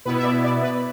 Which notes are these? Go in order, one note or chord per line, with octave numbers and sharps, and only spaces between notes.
B2 B3 E4 B4
E5
D5
D5
B4